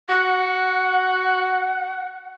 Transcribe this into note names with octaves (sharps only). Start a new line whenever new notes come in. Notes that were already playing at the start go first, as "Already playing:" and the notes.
F#4 F#5